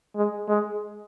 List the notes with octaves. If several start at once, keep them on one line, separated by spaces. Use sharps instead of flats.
G#3
G#3